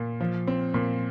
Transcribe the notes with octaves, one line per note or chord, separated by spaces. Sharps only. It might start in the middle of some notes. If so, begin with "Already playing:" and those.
Already playing: A#2
F3
C4
A#2